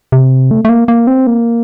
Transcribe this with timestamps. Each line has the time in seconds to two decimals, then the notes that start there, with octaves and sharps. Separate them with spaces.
0.12 C3
0.51 A3
0.65 A3
0.69 A#3
0.88 A#3
1.07 C4
1.27 A#3